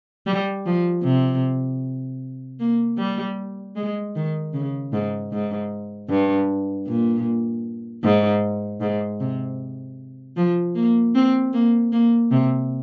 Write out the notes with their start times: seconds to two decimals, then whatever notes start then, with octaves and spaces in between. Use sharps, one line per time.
0.27 G3
0.66 F3
1.04 C3
2.60 A#3
2.98 G3
3.76 G#3
4.16 D#3
4.54 C#3
4.93 G#2
5.32 G#2
6.09 G2
6.87 A#2
8.04 G#2
8.81 G#2
9.20 C3
10.37 F3
10.75 A#3
11.15 C4
11.53 A#3
11.92 A#3
12.31 C3